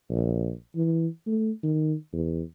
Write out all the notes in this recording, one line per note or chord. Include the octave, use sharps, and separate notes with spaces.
A#1
E3
A3
D#3
E2